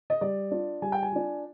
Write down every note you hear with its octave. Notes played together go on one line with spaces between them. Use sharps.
D#5
G3 D5
D4 F4
G3 G#5
G5
G#5
D4 F4